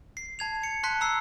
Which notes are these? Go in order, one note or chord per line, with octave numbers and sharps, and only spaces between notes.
C7
A5 G#6 F7
C#7
A5 C6 F#6 B6 C#7
A#5 E6 C7